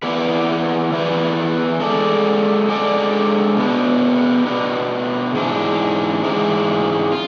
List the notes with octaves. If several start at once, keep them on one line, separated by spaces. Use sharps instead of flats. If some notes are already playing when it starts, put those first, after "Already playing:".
E3 B3 E4 B4 D5
E3 B3 E4 B4 D5
G#3 D4 A4 D5
G#3 D4 A4 D5
B2 B3 D4
B2 B3 D4
G#2 E3 G#3 D4
G#2 E3 G#3 D4
F4